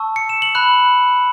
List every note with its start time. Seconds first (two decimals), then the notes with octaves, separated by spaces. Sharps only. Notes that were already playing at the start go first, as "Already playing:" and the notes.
Already playing: A5 C#6 E6
0.16 C#7
0.29 E7
0.42 F#7
0.55 B5 F#6